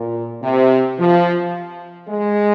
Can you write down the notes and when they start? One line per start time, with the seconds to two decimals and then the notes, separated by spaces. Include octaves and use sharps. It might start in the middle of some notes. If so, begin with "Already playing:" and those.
Already playing: A#2
0.42 C3
0.99 F3
2.08 G#3